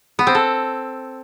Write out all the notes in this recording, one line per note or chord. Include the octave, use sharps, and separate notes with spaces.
B3
C4
A4